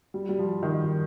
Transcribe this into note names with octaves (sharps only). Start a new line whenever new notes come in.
G3
G3
F3
D#3